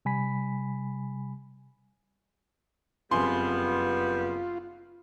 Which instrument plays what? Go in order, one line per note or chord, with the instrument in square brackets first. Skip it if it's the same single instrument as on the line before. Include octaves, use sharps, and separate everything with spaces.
[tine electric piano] C3 G3 G#5 B5 B6
[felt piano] F#1 F2 G#5 [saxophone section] G3 B3 [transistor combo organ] F4 [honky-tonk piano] C6